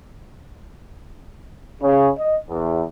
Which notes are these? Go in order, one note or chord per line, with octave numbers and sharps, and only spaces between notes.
C#3
D#5
E2